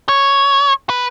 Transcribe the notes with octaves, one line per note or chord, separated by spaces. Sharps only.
C#5
B4